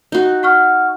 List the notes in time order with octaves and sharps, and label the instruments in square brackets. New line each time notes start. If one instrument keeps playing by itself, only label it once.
[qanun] D#4 F#4
[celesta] F#5 C#6 F6